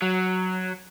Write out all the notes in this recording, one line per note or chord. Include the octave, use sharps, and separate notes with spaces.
F#3